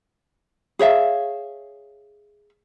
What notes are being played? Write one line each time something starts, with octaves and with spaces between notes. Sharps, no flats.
G#4 C#5 E5 F5